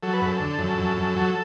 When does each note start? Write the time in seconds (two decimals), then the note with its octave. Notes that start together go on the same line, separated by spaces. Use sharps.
0.03 F#3 A4
0.13 B4
0.22 F#2 A4
0.40 D3
0.59 F#2
0.78 F#2
0.97 F#2
1.16 F#3